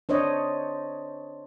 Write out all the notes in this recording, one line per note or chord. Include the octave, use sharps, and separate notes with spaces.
D4 C5 C#5 D#5